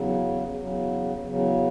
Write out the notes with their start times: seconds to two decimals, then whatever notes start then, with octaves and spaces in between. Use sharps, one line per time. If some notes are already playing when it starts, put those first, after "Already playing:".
Already playing: E2 C#3 F#3
0.57 E2 C#3 F#3
1.27 E2 C#3 F#3